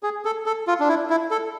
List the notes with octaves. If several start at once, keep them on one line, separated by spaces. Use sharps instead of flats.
G#4
A4
A4
F4
D4
E4
E4
A4